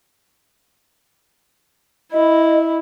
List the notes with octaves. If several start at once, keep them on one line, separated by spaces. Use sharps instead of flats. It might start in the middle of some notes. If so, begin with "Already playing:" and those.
E4 D#5